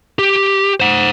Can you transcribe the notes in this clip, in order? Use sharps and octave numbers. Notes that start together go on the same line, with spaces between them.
G4
C5 F#5